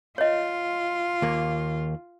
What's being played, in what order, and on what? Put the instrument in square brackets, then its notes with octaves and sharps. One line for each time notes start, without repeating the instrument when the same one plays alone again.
[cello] F4 [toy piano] C#5 D#5
[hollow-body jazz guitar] D#2 A#3